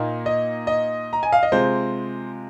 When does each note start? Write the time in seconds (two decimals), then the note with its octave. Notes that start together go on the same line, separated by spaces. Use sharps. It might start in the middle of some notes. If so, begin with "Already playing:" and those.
Already playing: A#2 A#3 D#4
0.26 D#5
0.67 D#5
1.13 A#5
1.23 G#5
1.33 F5
1.43 D#5
1.52 C3 G#3 F4 C5